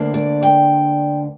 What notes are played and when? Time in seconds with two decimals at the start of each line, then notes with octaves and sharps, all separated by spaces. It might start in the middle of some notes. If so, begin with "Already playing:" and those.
Already playing: D2 D3 A#3 D4
0.14 D5
0.43 G5